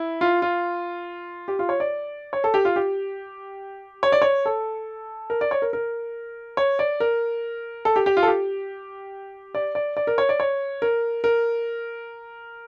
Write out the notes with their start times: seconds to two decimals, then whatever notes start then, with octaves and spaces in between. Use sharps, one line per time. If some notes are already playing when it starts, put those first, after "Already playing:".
Already playing: E4
0.21 F4
0.42 F4
1.48 G4
1.59 F4
1.69 C#5
1.80 D5
2.33 C#5
2.44 A4
2.54 G4
2.65 F4
2.76 G4
4.03 C#5
4.12 D5
4.22 C#5
4.46 A4
5.30 A#4
5.41 D5
5.51 C#5
5.62 A#4
5.73 A#4
6.57 C#5
6.79 D5
7.00 A#4
7.85 A4
7.96 G4
8.06 G4
8.17 F4
8.23 A4
8.27 G4
9.55 D5
9.75 D5
9.97 D5
10.07 A#4
10.18 C#5
10.29 D5
10.40 C#5
10.82 A#4
11.24 A#4